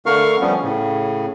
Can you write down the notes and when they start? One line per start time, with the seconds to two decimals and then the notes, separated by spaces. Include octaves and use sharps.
0.06 D3 A3 A#4 F5 C#6 F6
0.40 F3 G3 A3 B3 C#4
0.62 A2 C#3